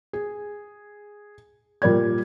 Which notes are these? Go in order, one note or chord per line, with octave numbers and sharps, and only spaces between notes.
G#4
A#2 G3 A#4 D5 G#6